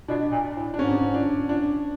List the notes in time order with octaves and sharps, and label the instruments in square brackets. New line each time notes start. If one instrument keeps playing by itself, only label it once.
[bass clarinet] B2 [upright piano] D4
[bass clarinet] A#2
A2
[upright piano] D4
[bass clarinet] G#2 [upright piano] C#4
[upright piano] D4
D4